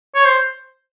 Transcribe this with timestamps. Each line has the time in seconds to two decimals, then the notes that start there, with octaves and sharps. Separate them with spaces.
0.15 C#5
0.26 C5